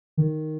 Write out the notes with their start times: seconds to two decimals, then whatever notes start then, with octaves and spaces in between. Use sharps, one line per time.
0.17 D#3